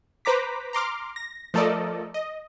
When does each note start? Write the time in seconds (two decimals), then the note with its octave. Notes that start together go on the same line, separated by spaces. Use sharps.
0.25 B4 C5 A#5 D6 B6
0.73 A#5 C6 D6 F6
1.16 A#6
1.54 F3 A3 A4 A#4 D5 D#5
2.14 D#5